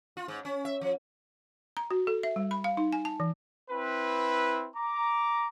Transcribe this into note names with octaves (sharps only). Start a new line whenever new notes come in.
F4
G#2
C#4
E5
F3
A#5
F#4
A4
E5
G3
B5
F5
D#4
G#5
A5
E3
C4 E4 B4
A#5 D6